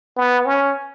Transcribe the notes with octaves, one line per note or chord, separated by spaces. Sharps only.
B3
C#4